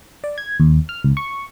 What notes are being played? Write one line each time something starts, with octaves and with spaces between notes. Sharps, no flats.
D5
G#6
D#2
F6
C#2
C#6